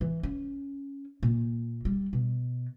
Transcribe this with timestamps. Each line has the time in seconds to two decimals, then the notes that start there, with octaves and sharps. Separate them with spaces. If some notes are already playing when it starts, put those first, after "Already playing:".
0.01 E3
0.23 C#4
1.23 A#2
1.85 G3
2.13 B2